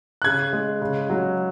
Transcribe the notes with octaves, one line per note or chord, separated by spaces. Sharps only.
F#6
C#3 G#6
G#3
C#3
F#3